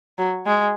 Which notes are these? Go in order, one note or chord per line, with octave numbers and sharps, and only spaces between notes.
F#3
G#3